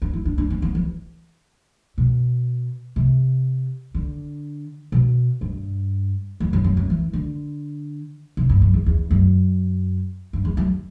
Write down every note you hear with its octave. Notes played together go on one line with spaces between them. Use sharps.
D4
E4
D4
D4
C4
B3
E3
B2
C3
D3
B2
G2
E2
F#2
F#2
F#2
E3
D3
C3
G2
F#2
E2
E2
F#2
G2
E2
F#2